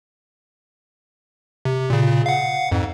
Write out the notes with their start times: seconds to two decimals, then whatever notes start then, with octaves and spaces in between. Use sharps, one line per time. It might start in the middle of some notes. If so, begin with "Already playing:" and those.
1.65 C3
1.90 A#2 C#3
2.26 F5 F#5
2.72 F2 G#2